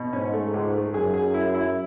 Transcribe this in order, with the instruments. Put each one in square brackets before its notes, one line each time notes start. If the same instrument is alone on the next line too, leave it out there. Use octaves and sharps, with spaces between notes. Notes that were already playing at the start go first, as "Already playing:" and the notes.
Already playing: [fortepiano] B2
[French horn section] G#2 [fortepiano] C#4
[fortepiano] A3
C#2
A3
[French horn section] F#2 [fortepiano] G#4
[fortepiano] G#4
E4
E4